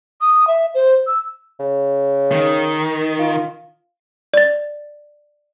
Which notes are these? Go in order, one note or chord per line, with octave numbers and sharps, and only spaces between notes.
D#6
E5
C5
E6
C#3
D#3
F4
D5 A6